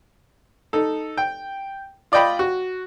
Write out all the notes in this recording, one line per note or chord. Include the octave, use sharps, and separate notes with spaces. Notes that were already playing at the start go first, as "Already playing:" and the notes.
D#4 A4
G5
F4 D5 D#5 G5 B5
F#4